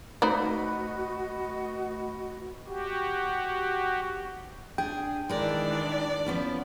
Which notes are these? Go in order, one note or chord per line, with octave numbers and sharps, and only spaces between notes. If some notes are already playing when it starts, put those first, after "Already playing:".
A3 D#4 F#4 B4 C5 D5 D#5
F#4 G4
D4 G#4 G5
D#3 E3 G#3 D4 A#4 D5
F3 B3 C#4